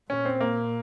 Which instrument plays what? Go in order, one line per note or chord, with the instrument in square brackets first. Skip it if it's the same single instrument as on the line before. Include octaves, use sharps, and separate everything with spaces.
[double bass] A#2 [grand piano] C#4
[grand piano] C4
A#3